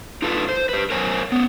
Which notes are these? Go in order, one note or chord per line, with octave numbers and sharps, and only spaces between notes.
D#4 F4 A4 B4
C5
G4 B4
A#4 C5 C#5 G#5
B3 C#4